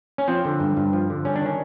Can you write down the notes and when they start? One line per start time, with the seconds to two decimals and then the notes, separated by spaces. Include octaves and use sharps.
0.18 C#4
0.28 F3 C4
0.45 D3
0.60 G2
0.77 G2
0.93 F3
1.10 D3
1.25 G3 C#4
1.36 D4
1.41 D#3 C#4